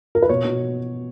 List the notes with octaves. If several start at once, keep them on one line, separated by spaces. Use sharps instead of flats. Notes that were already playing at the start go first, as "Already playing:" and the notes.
A#4
B4
B2 C#5
B2